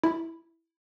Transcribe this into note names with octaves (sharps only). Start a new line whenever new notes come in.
E4 B5